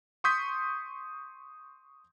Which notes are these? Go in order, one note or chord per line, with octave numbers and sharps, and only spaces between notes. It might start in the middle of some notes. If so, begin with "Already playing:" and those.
C6 C#6 D#6 G6 B6